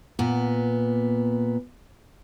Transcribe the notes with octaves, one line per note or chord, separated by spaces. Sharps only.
A#2 B3